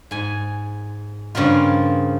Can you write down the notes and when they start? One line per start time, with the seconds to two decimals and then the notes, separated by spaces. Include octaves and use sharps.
0.11 G#2 G#5
1.35 G2 C#3 F3 A#3 F4